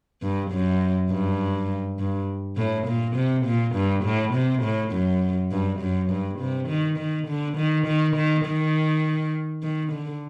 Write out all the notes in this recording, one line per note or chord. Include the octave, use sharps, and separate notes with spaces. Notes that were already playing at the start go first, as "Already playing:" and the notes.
G2
F#2
G2
G2
A2
A#2
C3
A#2
G2
A2
C3
A2
F#2
G2
F#2
G2
C3
D#3
D#3
D3
D#3
D#3
D#3
D#3
D#3
D3